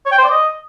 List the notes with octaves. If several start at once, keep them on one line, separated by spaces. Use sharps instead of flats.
C#5
G5
C5
D5
D#5